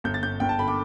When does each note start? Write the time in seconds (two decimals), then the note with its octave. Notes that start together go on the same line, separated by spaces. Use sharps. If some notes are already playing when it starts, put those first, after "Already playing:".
0.04 G1 G6
0.14 A6
0.23 G1 G6
0.40 G1 G5
0.49 A5
0.59 D3 B5
0.68 D6